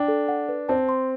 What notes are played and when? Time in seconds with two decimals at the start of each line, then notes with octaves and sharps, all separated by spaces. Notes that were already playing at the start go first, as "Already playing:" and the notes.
Already playing: D4 G5
0.08 A4
0.28 F#5
0.49 B4
0.69 C4 A5
0.89 C6